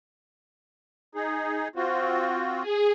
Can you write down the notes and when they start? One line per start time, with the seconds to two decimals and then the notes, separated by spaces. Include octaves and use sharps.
1.15 D#4 G#4
1.76 C4 F4 F#4
2.61 G#4